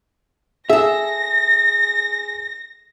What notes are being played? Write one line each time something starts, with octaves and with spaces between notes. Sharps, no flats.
G#4 A4 E5 A#6